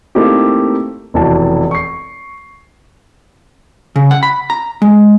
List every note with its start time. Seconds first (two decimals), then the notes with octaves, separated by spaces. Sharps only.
0.15 A3 A#3 C4 D#4 E4 G4
1.14 F1 B2 E3 A5
1.71 C#6 C7
3.96 C#3
4.11 F#5
4.23 B5
4.50 A#5
4.82 G#3